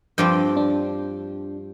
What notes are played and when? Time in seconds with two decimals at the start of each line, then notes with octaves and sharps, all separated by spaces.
0.18 G2 F3 C4 D6 G6
0.57 D4